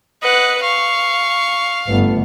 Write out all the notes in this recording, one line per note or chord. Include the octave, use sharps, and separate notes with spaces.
B4 D#5 F#5
F5 C#6
G1 A3 B3